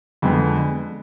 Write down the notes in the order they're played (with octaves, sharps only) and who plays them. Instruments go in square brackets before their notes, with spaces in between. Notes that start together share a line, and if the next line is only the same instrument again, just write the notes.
[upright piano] F2 D3 G#3 B3